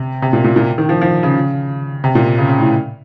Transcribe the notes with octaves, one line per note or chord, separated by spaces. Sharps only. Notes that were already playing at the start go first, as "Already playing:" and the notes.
Already playing: C3
C3
A#2
A#2
A#2
D#3
F3
F3
C#3
C3
A#2
C#3
C#3
A2